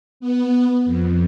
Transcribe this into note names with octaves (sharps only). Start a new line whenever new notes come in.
B3
F2